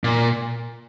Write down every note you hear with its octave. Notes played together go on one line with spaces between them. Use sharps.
A#2